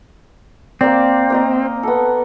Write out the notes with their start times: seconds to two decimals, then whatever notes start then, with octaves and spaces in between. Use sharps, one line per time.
0.81 A#3 C4 D5
1.30 A#3 A#4 D#5
1.83 B3 A4